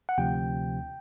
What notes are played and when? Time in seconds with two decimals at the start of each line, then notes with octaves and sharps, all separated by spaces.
0.09 F#5
0.18 D2 C3 F3 G5